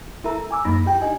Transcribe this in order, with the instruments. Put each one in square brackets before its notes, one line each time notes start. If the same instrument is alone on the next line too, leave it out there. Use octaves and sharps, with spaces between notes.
[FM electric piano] E4 A4 A#4 E5 A#5
G#5 D6 E6
F#2 F#3 A#3 D#4 B5 A#6
E4 G4 G5
D4 D#4 G4 D#5 G#5